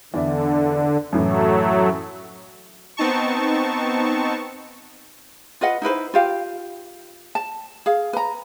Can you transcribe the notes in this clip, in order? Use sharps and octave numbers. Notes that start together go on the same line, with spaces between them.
E2 D3 D4 E5
F#2 A2 E3 F#3 A3
B3 C4 D#4 A5 C#6
F4 B4 D#5 F#5
D#4 E4 B4 C5
F4 G4 F5
A5
G#4 F5
B4 A#5